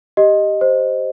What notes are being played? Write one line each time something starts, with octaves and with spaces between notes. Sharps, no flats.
G4 D#5
C5